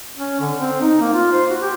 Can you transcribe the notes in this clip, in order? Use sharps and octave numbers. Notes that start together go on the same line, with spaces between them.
C#4
D3
C4
D#4
A#3
F4
C5
F#4
G4